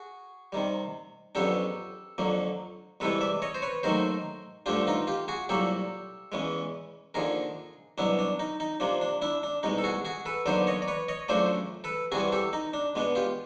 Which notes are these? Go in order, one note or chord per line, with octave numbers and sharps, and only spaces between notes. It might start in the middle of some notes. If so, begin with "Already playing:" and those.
Already playing: F#4 G#4
C3 D#3 G3
F2 C#3 F#3 B3 D4 G4 A4
F2 D3 F#3 A#3
C2 C3 E3 G#3 C4 A4 B4
D5 E5
C#5 D#5
C5
B4 C#5
D#2 D#3 F#3 A3 A#4 C5
G2 D3 F3 A3 D4 F4 G4
D#4 F4
F4 G4
F#4 G#4
C2 A#2 F#3 A#3 G4 A4
E2 C#3 E3 G#3
D#2 D3 F3 G#4 A#4
C2 B2 F#3 B3 D4 E4
D4
D#4
D#4
C3 F3 A#3 D4
D4
D4 E4
D4
C2 B2 G#3 D#4
A4
F#4 G#4
F#4 G#4
A4 B4
D#2 D3 F#3 B3 D4 C5 D5
C#5 D#5
D5
B4 C#5
C#5 D#5
F#2 C#3 F3 A3 D4 C5 D5
A4 B4
C3 E3 G3 C4 F#4 G#4
G4 A4
D#4
D4
B2 G#3 B3 D4
F4 G4